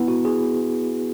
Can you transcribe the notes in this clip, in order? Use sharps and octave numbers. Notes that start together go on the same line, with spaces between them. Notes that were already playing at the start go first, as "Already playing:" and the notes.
Already playing: B3 E4
F#4
G#4